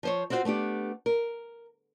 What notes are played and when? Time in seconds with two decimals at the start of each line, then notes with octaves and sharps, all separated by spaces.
0.03 F3 C5 C#5
0.30 C4 F4 F#4 A#4 C5
0.45 A3 B3 D4 G4
1.06 A#4